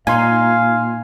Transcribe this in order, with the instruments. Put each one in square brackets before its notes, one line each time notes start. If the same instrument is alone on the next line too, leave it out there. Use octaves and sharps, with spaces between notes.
[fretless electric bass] A#2 [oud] D#4 [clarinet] F5 [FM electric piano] G#5 C6